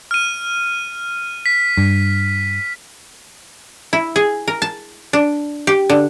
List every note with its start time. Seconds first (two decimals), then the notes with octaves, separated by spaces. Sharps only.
0.11 F6 D#7
1.46 B6
1.77 G2
3.93 E4
4.16 G#4
4.48 A#4
4.62 A5
5.13 D4
5.67 G4
5.90 D3